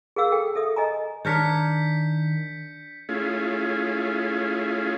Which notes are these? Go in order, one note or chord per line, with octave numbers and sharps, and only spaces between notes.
G#4 A#4 F5 E6
A4 G5
A4 E5 D#6
D#5 G#5 A#5
D#3 D4 A#4 C#5 G6 B6 C#7
A3 C#4 E4 F4 G#4